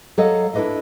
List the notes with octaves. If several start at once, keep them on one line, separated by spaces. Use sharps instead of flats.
F#3 A4 C#5 D#5 F5 F#5
D4 E4 A4 B4 D#5 F5